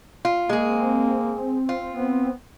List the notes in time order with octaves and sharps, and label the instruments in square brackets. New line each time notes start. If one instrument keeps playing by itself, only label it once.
[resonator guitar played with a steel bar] F4
[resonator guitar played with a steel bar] G#3 G#4 [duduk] A#3
[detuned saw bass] C4
[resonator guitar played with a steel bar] F4
[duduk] B3